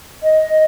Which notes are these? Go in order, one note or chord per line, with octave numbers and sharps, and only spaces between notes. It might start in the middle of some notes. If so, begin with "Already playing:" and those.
D#5